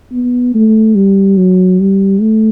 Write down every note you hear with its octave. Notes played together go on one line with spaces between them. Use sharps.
B3
A3
G3
F#3
G3
A3